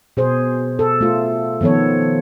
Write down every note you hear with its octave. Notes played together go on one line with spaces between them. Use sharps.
B2 G#4 C5
A4
A3 F4
D#3 F3 B3 A4 C#5